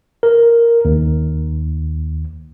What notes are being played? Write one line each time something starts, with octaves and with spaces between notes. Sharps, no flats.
A#4
D#2